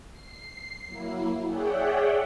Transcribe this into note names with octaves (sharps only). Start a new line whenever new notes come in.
C7
F#3 A#3 E4
G#4 C#5 D5 E5 F#5 G5